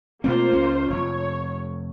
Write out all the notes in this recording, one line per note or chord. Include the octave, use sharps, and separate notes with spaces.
B2 A3 A#3 C4 F4 C5
C#2 C#4
F1 C#5